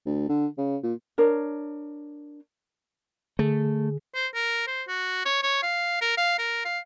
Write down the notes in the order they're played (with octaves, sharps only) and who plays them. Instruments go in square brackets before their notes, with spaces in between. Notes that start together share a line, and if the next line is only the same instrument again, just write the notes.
[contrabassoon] D2
D3
C#3
A#2
[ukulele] D4 A#4 C#5
[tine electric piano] D3 G#4 [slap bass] A3
[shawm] C5
A#4
C5
F#4
C#5
C#5
F5
A#4
F5
A#4
F5